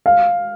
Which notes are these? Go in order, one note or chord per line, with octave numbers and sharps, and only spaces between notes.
F5